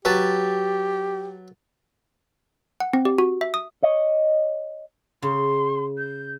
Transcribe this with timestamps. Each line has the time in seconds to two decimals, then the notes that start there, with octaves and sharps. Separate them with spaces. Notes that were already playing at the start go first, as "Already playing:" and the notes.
0.05 F#3 G4 B4 A5
2.80 F#5
2.93 C4
3.05 G4
3.18 F#4
3.41 E5
3.54 D#6
3.83 C#5 D#5
5.22 C#3 C6
5.97 G6